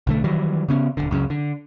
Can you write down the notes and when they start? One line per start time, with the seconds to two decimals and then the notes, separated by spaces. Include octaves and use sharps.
0.07 B1 D3 A3
0.24 D#3 E3 F#3 G3
0.69 C#3 B3 C#4
0.97 D#1 G#1 D3
1.11 C#2 F#2 C#3
1.30 D3